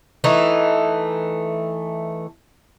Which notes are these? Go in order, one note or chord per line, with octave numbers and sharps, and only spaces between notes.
E3 A3 D#4